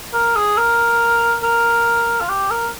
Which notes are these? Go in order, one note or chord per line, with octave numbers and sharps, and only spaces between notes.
A#4
G#4
A#4
A#4
F4
G4
A#4